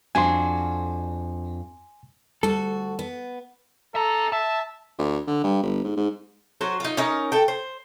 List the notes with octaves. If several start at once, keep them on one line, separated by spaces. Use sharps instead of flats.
F2 D4 F#4 G#5 C6
D2 G3 F#4 A4
B3
A4 E5 A#5
E5 A5
D2
D3
G2
G1
G#2
G#2
F#3 F#4 C5
D#4 F4
C#4 D#4 A#4
A4 G5
C5